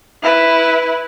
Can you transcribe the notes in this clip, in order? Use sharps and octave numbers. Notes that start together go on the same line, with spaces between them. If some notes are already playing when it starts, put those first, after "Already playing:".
E4 B4